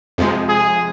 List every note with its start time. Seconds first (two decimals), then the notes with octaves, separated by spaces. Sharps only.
0.18 F2 C3 F3 G#3
0.49 G#4